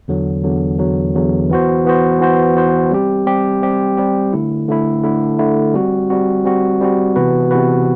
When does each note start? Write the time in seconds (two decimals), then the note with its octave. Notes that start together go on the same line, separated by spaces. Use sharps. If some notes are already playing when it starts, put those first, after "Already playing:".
0.08 E2 D3 F#3
0.44 E2 D3 F#3
0.79 E2 D3 F#3
1.15 E2 D3 F#3
1.50 E3 B3 F#4 C5
1.85 E3 B3 F#4 C5
2.21 E3 B3 F#4 C5
2.56 E3 B3 F#4 C5
2.91 G3 C4 G4
3.27 G3 C4 G4
3.62 G3 C4 G4
3.97 G3 C4 G4
4.33 D3 A3 E4
4.68 D3 A3 E4
5.03 D3 A3 E4
5.39 D3 A3 E4
5.74 G3 C4 F#4
6.10 G3 C4 F#4
6.45 G3 C4 F#4
6.81 G3 C4 F#4
7.16 C3 E3 B3 F#4 B4
7.51 C3 E3 B3 F#4 B4